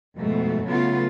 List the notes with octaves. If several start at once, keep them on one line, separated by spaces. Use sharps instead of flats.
F2 G#2 B2 A3
C#3 F#3 A3 B3 F4